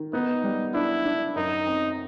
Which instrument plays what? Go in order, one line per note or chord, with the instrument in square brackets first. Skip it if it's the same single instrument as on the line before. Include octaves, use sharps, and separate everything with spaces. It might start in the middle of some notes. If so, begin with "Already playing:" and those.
Already playing: [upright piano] D#3
[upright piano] B3 [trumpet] D#4
[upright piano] G3
[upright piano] D4 [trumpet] E4
[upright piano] D4
[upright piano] F#2 [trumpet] D#4
[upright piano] C4